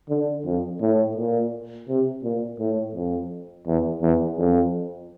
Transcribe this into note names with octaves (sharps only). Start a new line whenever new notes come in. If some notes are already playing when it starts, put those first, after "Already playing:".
D3
F2
A2
A#2
C3
A#2
A2
F2
E2
E2
F2